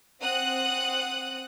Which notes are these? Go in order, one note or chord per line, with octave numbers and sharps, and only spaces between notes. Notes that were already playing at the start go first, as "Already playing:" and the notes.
C4 F#5 D#6 F#6